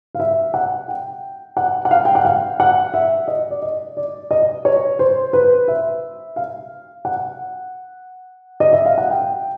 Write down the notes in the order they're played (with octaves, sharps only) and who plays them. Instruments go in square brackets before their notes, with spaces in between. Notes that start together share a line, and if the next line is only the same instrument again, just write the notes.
[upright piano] F5
E5
F#5
G5
F#5
F#5
F5
G5
F#5
F5
F#5
E5
D#5
D5
D#5
D5
D#5
C#5
C5
B4
E5
F5
F#5
D#5
E5
F5
F#5
G5